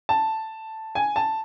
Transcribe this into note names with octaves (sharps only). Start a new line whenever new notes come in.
A5
G#5
A5